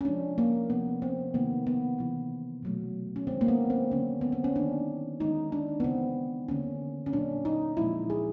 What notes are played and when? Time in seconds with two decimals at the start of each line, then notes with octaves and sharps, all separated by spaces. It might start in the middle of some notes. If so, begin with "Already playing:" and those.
0.01 C#4
0.05 C3 F3 G#3 D4
0.38 A#3
0.70 C3 F3 A#3 B3
1.02 C4
1.34 C3 D#3 G3 A#3 B3
1.67 B3
1.98 C3 E3 G3
2.63 B2 F#3 A3
3.16 C#4
3.27 D#3 G#3 C4
3.41 A#3
3.48 B3
3.70 C4
3.91 D3 F#3 A#3 C#4
4.21 B3
4.32 C4
4.44 C#4
4.56 D#3 G3 A#3 D4
5.20 D#3 G#3 D#4
5.52 D4
5.80 B3
5.84 C#3 E3 G#3 C4
6.48 D3 G3 A#3 C#4
7.06 C#4
7.13 A#2 F#3 A#3 D4
7.45 D#4
7.77 A#2 F3 G#3 E4
8.10 G#4